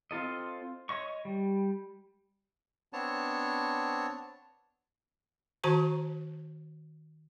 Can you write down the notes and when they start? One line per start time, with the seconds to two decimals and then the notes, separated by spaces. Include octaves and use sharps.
0.11 C4 F4 A4 D#5
0.89 C#5 D#5 C#6
1.25 G3
2.93 B3 C4 D4 C#5 A5
5.64 D#3 F#4 C5 A5 A#5 C#6